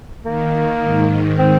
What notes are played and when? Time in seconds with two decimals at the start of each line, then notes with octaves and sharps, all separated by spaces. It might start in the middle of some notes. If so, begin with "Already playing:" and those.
0.25 D#3 A#3
0.82 G#2
1.39 C4